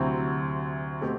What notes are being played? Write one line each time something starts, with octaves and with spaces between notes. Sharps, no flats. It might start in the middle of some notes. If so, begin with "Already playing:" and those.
Already playing: D2 C3 F#3 C4 E4
B2 A3 C4 G4